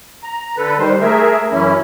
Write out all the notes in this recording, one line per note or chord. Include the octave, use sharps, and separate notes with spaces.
A#5
D3 A4 B4
D#3 G3 C5
A3 G#4 A#4 E5
F#2 E3 C#4 E4